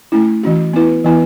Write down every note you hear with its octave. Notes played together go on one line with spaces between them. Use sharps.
A3 C#4 E4
E3 C#4 F#4
B3 E4 B4
E3 B3 E4 B4